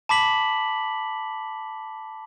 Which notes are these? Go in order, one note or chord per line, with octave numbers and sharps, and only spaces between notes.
A5 B5 D6 B6 F#7